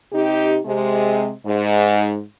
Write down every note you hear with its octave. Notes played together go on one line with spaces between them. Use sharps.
C3 D#4 G4
C3 G#3
G#2